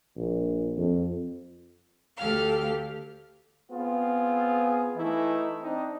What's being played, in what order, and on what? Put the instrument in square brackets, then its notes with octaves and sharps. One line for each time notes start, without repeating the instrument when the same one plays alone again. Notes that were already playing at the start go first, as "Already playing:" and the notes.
[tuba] A#1
F2
[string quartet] D2 G4 A4 F5 F6
[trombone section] B3 C4 F4 G#4
E3 A3 D#4 E4
C4 D4 D#4